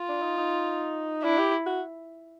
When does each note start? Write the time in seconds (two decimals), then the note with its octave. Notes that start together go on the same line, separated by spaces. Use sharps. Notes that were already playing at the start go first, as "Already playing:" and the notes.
Already playing: F4
0.09 D4
0.22 D#4
0.38 D#4
1.23 D4 E4
1.38 G4
1.66 F#4